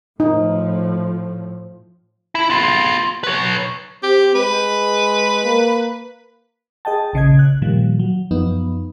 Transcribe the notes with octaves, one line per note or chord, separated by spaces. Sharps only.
A2 F3 D#4
E4
B3 F4
B4 C#5
C4 G4
G#3 B4
A#3
G#4 D#5 G5 A5
A#1 C#3 D#5 G#6
F#6
A#2 D#3 F3 G3
F#3
F#2 F3 B3 D#4